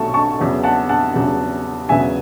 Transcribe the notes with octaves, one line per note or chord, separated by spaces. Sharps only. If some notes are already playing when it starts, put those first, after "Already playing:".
Already playing: B1 B2 F#3 A3 A5 C#6
A5 C#6
E2 C#3 F#3 B3
F#5 A5
F#5 A5
E2 C#3 F#3 B3
E1 E2 C#3 F#3 B3 E5 G#5